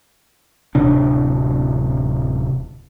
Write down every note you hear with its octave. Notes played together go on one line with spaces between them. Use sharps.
D1 C3 D4